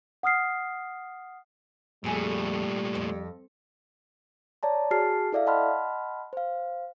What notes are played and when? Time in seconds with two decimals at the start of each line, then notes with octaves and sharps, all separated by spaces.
0.23 F#5 D#6 F6 C7
2.04 F2 A#2 G3 A3 G#4
2.95 F2
4.63 C#5 D5 A5 A#5
4.91 F#4 G#4 A5 F6 C7
5.32 E4 A4 D5 E5 F5
5.46 D#5 F#5 A5 B5 C6 F6
6.33 C5 F5